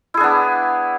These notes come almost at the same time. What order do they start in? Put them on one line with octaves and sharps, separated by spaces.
E4 G#4 D4 B3